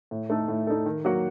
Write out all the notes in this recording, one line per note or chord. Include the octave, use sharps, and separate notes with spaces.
A2
A3 D#4 A4
A2
A3 D#4 A4
D#3
F#3 A#3 F#4